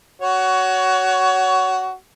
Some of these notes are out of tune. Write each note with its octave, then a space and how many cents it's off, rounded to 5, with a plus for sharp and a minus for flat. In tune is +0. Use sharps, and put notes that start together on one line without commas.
F#4 +15 C#5 +20